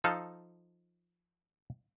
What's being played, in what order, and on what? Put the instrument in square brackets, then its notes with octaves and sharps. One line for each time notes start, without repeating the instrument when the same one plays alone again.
[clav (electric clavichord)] F3 D#4 A4 F5